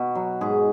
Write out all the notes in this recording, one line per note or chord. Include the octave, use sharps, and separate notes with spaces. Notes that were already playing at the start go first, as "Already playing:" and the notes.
Already playing: B2 F#4
F#3
G#2 G#4